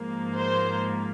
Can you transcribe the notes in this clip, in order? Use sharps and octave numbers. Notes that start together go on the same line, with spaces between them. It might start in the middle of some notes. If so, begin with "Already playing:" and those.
Already playing: G#2 F3 A#3
C5